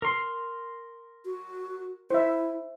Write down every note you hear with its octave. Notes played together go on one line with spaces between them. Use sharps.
A#4 C6
F#4
E4 C5 E5